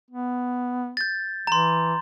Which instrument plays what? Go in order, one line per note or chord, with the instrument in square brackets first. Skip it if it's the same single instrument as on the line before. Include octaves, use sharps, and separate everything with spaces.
[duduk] B3
[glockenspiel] G6 A6
[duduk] E3 [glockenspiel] A#5 C6